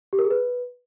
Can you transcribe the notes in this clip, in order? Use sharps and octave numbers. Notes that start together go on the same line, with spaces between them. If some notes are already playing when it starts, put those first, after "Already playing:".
G4
A#4
G#4
B4